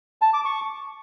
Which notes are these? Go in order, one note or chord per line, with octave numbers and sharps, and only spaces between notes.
A5
D6
C#6